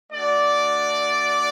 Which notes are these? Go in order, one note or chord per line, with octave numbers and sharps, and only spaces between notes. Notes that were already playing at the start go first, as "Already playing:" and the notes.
A3 D4 F#4 D5